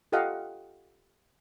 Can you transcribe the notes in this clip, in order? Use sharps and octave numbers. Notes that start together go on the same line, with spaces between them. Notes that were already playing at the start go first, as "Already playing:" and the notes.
F4 G4 A4 D#5 F5 F#5